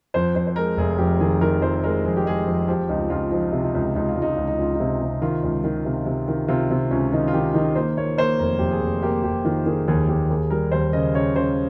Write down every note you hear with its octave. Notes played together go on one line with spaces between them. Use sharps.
F2 C5
F2 C5
C5
G#3 A#4
F1 G#4
F2 G4
D#3 G#4
D#3 A#4
F2 C5
G#3 A#4
F2 G#4
G4
G#3 G#4
F2
F3 G4
C#2 D#4
C#2 F4
F3 D#4
C3
D#4
C#2
C#2 D#4
F4
C#2
D#4
C#2 F4
D#4
C#2 F4
D#4
C3
C3
D#3 F4
C#2
D#3
C3
C3
D#3
C3 F4
C3
C#2 C#4
D#3 D#4
F4
D#3 G4
D#3 D#4
A#3 C5
A#3 C#5
A#3 C5
F1 A#4
F1 G4
G#4
F1
A#3 G4
F1 G4
D#3 F4
D#3 G#4
D#2 G#4
D#2 G4
D#2 G#4
G3 A#4
D#2 C5
C#3 D#5
C#3 C#5
C#3 C5